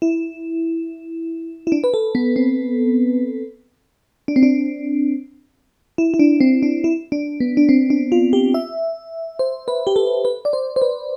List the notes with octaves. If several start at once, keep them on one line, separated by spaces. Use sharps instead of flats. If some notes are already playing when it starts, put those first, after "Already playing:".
E4
E4
D4
B4
A4
B3
C4
D4
C4
D4
E4
E4
D4
C4
D4
E4
D4
B3
D4
C4
D4
F4
G4
E5
C5
B4
G4
A4
B4
D5
C5
C5
B4